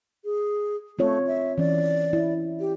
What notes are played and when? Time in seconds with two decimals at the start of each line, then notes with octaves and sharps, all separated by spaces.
0.25 G#4
0.99 A3 C4 F4 C#5
1.27 E5
1.58 E3 C#4 D5
2.13 E4
2.60 G4